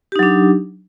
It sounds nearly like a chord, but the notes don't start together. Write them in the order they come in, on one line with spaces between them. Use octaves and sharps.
G4 D#4 F#3 D4